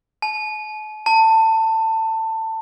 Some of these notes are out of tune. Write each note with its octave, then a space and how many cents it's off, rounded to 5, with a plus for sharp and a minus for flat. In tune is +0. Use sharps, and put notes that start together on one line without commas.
A5 -45
A5 +20